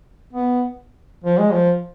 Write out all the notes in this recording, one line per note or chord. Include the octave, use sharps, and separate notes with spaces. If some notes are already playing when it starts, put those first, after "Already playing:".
B3
F3
G#3
F3